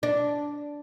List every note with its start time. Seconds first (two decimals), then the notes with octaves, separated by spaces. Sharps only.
0.03 D4